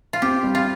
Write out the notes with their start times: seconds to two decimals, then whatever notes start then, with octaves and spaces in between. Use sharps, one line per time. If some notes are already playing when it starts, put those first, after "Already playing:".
0.13 F4
0.22 C4 G4
0.43 G3
0.55 F4